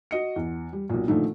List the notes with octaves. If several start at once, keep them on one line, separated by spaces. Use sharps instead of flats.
F#4 D#5 C#7
E2
G3
B1 A#2
A#2 D3 D#3 F3 A3 D#4